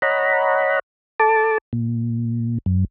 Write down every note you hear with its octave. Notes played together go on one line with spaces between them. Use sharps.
C#5 D#5 F#5 A#5 B5
A4 A5 D6
A#2
F#2